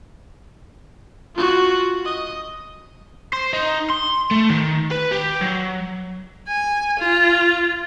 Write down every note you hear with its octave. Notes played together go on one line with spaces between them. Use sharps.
F4 F#4
D#5
C5
D#4
C6
A3
D#3
B4
G4
F#3
G#5
F4